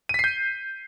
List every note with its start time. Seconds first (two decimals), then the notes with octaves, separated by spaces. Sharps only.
0.09 D#7
0.14 B6
0.19 C7
0.24 G6